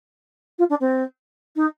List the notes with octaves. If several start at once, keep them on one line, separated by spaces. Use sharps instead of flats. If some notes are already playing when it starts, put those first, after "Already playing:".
F4
D4
C4
D#4